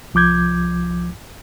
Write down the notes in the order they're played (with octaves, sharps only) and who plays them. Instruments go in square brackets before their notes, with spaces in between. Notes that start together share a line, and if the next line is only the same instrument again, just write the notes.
[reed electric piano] C2 F3 D6 G6 G#6